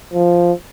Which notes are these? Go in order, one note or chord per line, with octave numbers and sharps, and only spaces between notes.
F3